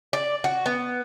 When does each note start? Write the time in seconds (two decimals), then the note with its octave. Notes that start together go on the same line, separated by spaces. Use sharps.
0.13 D5
0.44 F#4
0.66 B3